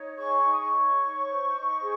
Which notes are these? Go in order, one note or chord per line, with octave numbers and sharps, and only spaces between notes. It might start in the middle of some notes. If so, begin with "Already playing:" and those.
Already playing: D#4 C#5
G#4 C#6
D#4
D#6
C#6
C#5
D#4
C5
D#4
G#4